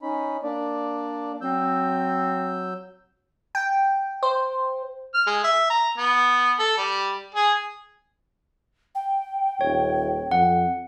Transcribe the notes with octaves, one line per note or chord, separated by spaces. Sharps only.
C#4 D#4 B5
A#3 D4 D5
F#3 C4 E6 G6
G5
C5
F6
G#3
E5
A#5
B3
A4
G3
G#4
G5
D#1 C#5
F2 F#5